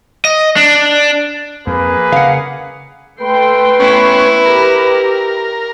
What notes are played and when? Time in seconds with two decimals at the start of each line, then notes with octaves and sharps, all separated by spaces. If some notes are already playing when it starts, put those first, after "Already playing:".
0.25 D#5
0.56 D4
1.67 F2 A#3 G#4 B4
2.12 C#3 F5 F#5
3.21 A3 B4 G5 C6
3.80 B3 C#4 E4
4.46 G4 A#4